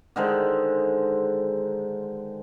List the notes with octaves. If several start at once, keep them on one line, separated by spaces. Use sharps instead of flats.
D3 D#3 G#3 C5